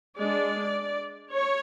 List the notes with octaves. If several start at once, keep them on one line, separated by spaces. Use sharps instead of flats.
G#3 D4 D5
C#5